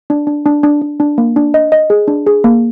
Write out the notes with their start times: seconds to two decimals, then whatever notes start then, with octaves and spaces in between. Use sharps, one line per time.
0.10 D4
0.27 D4
0.46 D4
0.63 D4
0.82 D4
1.00 D4
1.18 A#3
1.36 D4
1.54 D#5
1.72 D#5
1.90 G#4
2.08 D4
2.27 G#4
2.44 A#3